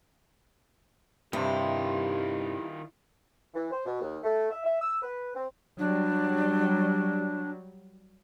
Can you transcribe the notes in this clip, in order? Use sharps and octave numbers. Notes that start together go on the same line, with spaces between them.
G2 C3 D#3 E4 F4 G4
E3
C5
B2
D#2
A3
E5
E5
E6
B4
C4
F#3 G3 D4